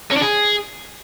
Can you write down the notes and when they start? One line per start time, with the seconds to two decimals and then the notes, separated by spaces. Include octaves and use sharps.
0.12 C#4
0.17 D4
0.22 G#4